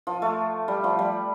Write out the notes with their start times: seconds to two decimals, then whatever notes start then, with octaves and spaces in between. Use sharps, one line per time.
0.07 F3
0.22 A3
0.68 G3
0.84 F3
0.99 G3